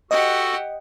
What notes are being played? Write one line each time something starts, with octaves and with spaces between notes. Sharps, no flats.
F#4 G4 A4 D#5 F#5